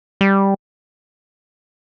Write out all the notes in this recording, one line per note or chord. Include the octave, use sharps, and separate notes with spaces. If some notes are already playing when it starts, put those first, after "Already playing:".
G3